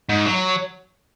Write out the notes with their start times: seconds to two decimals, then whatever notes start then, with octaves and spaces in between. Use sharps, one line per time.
0.09 G#2
0.26 F#3